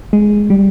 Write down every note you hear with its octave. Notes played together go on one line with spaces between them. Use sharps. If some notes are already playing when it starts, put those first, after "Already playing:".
G#3
G3